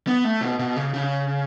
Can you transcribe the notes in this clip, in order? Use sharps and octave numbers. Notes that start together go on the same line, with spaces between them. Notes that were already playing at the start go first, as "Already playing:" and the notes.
B3
A3
B2
B2
C#3
C#3